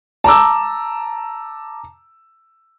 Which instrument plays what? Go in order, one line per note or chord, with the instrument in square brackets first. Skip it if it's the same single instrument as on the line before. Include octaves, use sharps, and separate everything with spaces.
[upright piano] A5 A#5 D6 E6